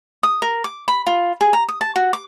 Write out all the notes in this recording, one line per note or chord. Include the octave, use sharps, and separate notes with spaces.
D#6
A#4
D6
B5
F4
G#4
A#5
D#6
A5
F#4
D6